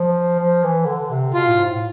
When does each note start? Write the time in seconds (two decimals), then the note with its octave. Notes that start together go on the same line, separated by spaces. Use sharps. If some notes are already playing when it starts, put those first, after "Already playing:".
Already playing: F3
0.39 F3
0.64 E3
0.86 D3
0.99 D3
1.10 C3
1.34 B2 F4
1.47 A2
1.58 G#2
1.69 A2